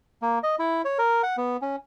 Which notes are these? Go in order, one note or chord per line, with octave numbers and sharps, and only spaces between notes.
A#3
D#5
E4
C#5
A#4
F#5
B3
C#4